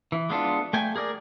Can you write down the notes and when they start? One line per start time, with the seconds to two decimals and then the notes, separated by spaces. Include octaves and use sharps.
0.12 E3
0.30 G#3 B3 D4 F4 A4
0.73 A3 G5 G#5
0.96 G#4 A#4 D5